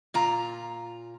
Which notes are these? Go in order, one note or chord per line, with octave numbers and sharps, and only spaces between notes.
A#2 F4 A#5